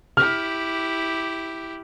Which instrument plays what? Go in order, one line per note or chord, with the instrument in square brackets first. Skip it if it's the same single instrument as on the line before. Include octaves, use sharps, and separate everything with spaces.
[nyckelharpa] E4 G4 [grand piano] F6